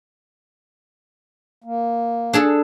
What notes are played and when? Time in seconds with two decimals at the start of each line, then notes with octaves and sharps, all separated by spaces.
1.64 A#3
2.33 D4 G#4 A4